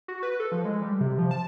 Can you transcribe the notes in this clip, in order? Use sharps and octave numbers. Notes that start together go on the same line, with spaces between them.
F#4
B4
A4
F3
G#3
G3
C3
F3
A5